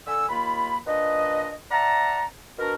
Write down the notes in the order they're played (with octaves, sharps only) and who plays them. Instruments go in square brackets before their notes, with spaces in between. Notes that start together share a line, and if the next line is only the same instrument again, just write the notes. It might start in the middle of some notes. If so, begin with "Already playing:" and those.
[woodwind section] D3 A4 G#5 E6
D#2 A#3 F4 B5
A#2 D4 B4 D#5
D5 E5 F#5 A5 A#5
B2 D4 F#4 A#4